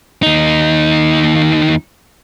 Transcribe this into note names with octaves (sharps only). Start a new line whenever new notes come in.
D#2 D#4